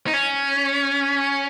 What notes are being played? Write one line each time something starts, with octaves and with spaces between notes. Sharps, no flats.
D#4
C#4